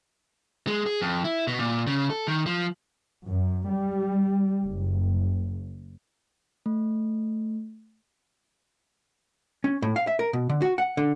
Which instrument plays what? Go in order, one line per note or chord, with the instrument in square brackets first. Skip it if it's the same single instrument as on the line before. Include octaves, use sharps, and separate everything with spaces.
[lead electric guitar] G#3
G#4
F2
E4
B2
A#2
C#3
A4
D#3
F3
[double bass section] F#2
G3
F#1
[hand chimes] A3
[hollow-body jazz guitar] C#4
A2
F5
E5
A#4
B2
D3
F#4
F#5
D3